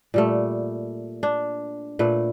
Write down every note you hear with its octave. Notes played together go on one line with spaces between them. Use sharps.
A#2 G3 A3
D4
A#2 A3 B4